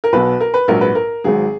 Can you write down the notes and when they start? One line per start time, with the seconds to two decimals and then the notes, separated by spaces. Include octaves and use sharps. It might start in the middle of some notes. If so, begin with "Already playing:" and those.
0.04 A#4
0.13 B1 B2 F#3 B4
0.40 A#4
0.54 B4
0.68 A#1 G#2 F#3 A#4
0.81 B4
0.95 A#4
1.24 G#1 G#2 F#3 G#4